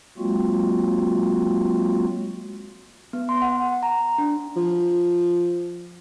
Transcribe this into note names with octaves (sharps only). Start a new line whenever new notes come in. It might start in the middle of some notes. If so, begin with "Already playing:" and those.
F#3 G#3 A#3 C4 F4 F#4
B3
C6
F#5
A#5
D4
F3